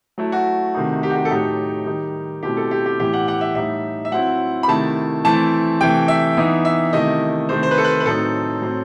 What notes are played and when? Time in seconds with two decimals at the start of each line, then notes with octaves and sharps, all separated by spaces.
0.18 F#3 A3 E4
0.32 F#4
0.75 C3 D#3 A3 D#4
1.03 G4
1.10 F#4
1.16 G4
1.25 A4
1.30 A2 F#3 A3 D#4 G4
1.86 D#3 G3 D#4
2.43 B2 A3 C4 E4 G4
2.57 A4
2.71 G4
2.85 G4
3.00 A2 E3 B3 E4 G4
3.13 F#5
3.28 F#5
3.41 E5
3.55 A2 G3 D#4 E5
4.05 E5
4.11 F#3 C4 E4 F#5
4.63 B5
4.68 C3 D#3 A3 E4 A5
5.24 E3 A3 C4 E4 A5
5.80 C3 E3 A3 G5
6.08 E5
6.37 E3 B3 D#4
6.65 E5
6.93 C3 D#3 A3 E4 D#5
7.49 C3 D#3 A3 C5
7.63 C5
7.71 B4
7.78 A4
7.84 B4
8.00 B4
8.05 A2 F#3 C4 D#4 A4
8.62 A2 F#3 C4